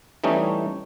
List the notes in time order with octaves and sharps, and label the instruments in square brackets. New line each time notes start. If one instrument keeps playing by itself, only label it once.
[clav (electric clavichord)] E3 G3 A3 C#4 D#4